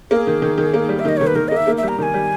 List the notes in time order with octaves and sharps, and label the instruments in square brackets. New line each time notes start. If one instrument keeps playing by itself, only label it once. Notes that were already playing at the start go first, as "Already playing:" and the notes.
[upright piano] A#3 [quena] G#4
[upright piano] D#3
D#3
D#3
A#3
G3
[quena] E5
[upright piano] D#3 [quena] D#5
[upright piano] D#3 [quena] C#5
[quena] B4
[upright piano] D#3 [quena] A#4
[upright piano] A#3 [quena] D#5
[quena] E5
[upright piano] A#3
[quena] E5
[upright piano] G3
[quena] A#5
[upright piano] D#3 [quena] A#5
[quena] G#5
[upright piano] G3